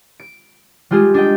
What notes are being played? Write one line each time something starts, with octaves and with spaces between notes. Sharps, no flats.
D7
G3 G#3 F4 G4 G#4
D4 D#5 G5